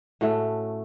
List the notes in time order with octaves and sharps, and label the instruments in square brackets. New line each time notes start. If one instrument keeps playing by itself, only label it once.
[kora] A2 A3 C#4 F#4